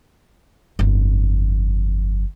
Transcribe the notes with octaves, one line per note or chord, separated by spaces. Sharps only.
G1 F2